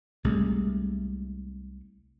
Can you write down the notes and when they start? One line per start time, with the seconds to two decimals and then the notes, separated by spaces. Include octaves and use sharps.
0.24 C2 G#3 A3